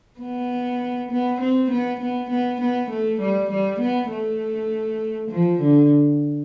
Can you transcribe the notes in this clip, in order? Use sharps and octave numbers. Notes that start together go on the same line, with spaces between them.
B3
B3
C4
B3
B3
B3
B3
A3
G3
G3
B3
A3
F3
D3